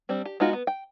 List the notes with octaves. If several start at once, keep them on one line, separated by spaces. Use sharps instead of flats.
G3 C4 D4
G4
G#3 B3 D#4 F4 F#4
B3
G5